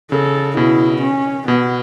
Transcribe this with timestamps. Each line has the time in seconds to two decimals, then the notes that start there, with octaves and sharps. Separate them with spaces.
0.11 C#3 A4
0.57 B2 E4
1.02 C#4
1.48 B2 B3